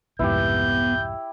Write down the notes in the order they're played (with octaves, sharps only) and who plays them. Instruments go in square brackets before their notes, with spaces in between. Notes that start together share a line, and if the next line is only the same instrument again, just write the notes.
[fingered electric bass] C2 F2 G#2 [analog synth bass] B3 [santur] E4 G4 [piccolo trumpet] G6